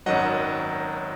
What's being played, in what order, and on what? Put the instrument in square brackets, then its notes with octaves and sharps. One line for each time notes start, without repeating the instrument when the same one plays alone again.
[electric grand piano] G#1 F#2 D#3 F#3 D#5 F#5